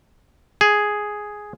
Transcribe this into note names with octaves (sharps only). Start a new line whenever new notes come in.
G#4